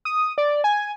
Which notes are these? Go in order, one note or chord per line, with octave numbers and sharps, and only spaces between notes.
D#6
D5
G#5